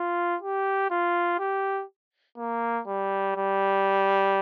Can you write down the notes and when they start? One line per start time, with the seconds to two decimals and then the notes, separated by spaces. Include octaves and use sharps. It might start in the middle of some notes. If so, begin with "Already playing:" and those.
Already playing: F4
0.42 G4
0.90 F4
1.39 G4
2.37 A#3
2.87 G3
3.36 G3